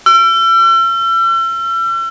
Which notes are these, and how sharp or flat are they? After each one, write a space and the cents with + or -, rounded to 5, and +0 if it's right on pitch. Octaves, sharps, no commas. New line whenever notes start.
E6 +40